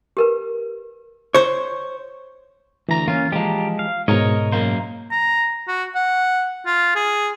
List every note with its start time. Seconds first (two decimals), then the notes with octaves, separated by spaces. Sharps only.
0.17 G4 A#4 B4
1.35 C5 C#5
2.89 D2 E3 A#5
3.08 A#3 C#4 F4
3.32 F3 G#3 G4 A#5
3.79 F5
4.08 G#2 B2 A#4 C#5 D#5 A#5
4.52 F#2 A#3 C5
5.11 A#5
5.68 F#4
5.95 F#5
6.66 F4
6.96 G#4